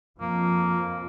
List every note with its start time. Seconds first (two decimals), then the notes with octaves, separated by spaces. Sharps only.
0.20 F2 F3 A#3